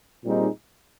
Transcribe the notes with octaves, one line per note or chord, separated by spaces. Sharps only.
A#2 G3 C4 D#4 G#4